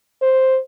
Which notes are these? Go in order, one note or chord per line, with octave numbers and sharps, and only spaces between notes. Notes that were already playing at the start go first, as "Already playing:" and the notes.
C5